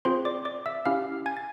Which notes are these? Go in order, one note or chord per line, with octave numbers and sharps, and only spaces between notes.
C4 F4 G#4 C5 C6
D5 D6
D5 D6
E5 E6
C#4 E4 G4 F5 F6
G#5 G#6
A6